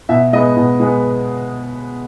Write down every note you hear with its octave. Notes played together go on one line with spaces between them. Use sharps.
B2 E5
G#3 B3 D#5
B2
G#3 B3